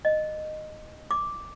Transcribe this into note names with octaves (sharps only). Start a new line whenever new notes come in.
D#5
D6